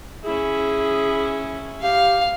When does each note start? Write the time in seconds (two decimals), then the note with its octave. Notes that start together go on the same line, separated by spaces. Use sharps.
0.25 C#4 E4 G#4
1.82 G4 F5